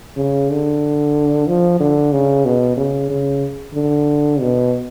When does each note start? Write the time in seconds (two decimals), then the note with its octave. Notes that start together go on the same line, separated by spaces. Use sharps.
0.17 C#3
0.50 D3
1.47 F3
1.80 D3
2.12 C#3
2.45 B2
2.77 C#3
3.10 C#3
3.74 D3
4.40 B2